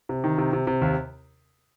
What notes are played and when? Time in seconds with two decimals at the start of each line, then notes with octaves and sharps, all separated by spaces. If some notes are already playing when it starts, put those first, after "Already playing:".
0.09 C3
0.24 D#3
0.38 C3
0.53 C3
0.67 C3
0.82 D#2